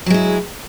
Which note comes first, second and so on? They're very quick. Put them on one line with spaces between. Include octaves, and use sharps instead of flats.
F#3 G#3 E4